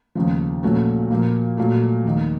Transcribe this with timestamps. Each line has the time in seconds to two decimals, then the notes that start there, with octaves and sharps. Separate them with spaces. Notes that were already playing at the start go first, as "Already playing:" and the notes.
0.15 F1 D#2 C#3 F3
0.63 A#1 A#2 A3 C#4 F#4
1.11 A#2 F3 A#3
1.57 A#2 F#3 A3
2.04 F1 D#2 D#3